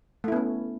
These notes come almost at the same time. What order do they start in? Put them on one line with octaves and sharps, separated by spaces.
A3 E4 B3 C#4